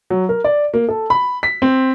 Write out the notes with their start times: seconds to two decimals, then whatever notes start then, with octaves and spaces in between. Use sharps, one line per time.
0.10 F#3
0.29 A#4
0.44 D5
0.74 A#3
0.89 A4
1.10 B5
1.43 B6
1.62 C4